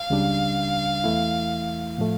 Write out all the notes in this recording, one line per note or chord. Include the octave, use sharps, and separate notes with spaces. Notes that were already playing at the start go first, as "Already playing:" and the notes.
Already playing: F5
C#2 C#3 G3 D4
E2 E3 A3 E4
A2 F3 A3